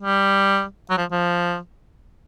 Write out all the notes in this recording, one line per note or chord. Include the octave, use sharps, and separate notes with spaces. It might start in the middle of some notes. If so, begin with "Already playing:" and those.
G3
F#3
F3
F3